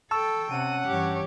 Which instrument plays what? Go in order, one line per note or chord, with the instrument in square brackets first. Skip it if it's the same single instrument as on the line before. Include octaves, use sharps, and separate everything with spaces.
[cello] A4 G5 [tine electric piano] A5 C#6 E6
[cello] C3 [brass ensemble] C#4 F#5 [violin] D#7
[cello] G2 E3 [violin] G4 C#5